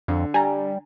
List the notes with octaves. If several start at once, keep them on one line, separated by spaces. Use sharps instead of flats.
F2 D3
G3 G#5 A#5